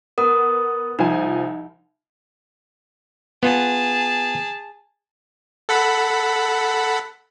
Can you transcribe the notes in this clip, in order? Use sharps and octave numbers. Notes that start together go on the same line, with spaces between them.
B3 A#4 D#6
C2 F3 D#4 G#5
B3 F4 G#4 A5
A4 F#5 B5